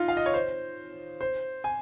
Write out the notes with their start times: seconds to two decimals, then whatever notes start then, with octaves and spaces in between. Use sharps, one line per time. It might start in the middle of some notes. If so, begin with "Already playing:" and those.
Already playing: D#4 F4
0.08 F5
0.17 D#5
0.26 C#5
0.34 C5
1.21 C5
1.64 G#5